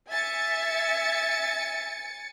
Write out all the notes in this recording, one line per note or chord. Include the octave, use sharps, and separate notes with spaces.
E5 G#5 A6 C#7